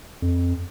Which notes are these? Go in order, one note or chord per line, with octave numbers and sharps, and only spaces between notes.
F2